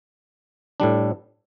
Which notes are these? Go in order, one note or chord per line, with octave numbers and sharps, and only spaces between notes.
A2 G3 D4